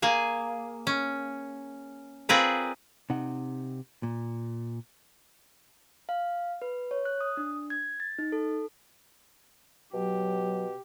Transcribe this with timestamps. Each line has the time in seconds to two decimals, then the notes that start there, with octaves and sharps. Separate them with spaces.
0.02 A#3 G#4 G#5
0.87 C#4
2.29 C4 F4 G#4 A#4 B4 D5
3.10 C3 D#4 F#5
4.03 A#2
6.09 F5
6.62 B4
6.91 C#5
7.05 F#6
7.21 D#6
7.37 D4
7.70 G#6
8.00 A6
8.19 D#4
8.32 A4
9.94 B2 F#3 G4